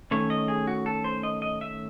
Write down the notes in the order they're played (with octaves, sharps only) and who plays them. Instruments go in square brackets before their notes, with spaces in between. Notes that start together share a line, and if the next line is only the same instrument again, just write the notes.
[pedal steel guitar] D#3 A3 C#4 C#5
D#5
G#4
F#4
A4
C5
D#5
D#5
E5